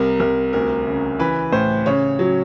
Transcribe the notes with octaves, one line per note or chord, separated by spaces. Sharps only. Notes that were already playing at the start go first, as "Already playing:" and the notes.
Already playing: C2 A#4
C2 A#4
D2 A#4
C#3
E3 B4
A2 C5
C#3 C#5
F#3